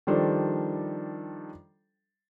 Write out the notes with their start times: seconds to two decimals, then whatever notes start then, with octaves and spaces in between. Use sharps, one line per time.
0.07 D#3 F3 G3 D4 A4 C5